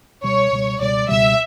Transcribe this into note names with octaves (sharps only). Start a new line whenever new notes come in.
C#2 B2 G3 C#5
C#2 B2 G3
C#2 B2 G3 D5
C#2 B2 G3 E5